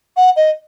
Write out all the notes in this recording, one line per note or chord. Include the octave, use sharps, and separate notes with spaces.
F#5
D#5